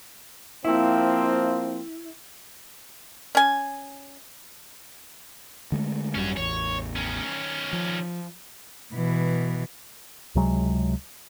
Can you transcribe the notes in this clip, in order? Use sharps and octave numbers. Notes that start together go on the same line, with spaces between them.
F3 A#3 C4 E4
C#4 G#5
D3 G#3 A3
G#1 F#2 G3 C#4 F#4
A1 E2 C#5
D#3 C#4
F3
B2 E3
C#2 C3 F#3 G#3